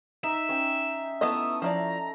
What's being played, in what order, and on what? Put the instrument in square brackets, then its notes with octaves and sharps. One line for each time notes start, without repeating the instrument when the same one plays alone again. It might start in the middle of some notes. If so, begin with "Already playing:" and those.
[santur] D#4 [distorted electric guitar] E5
[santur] C#4 G5
[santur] A3 [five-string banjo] B3 E4 D#5 [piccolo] D#6
[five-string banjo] F3 E4 D5 [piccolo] A#5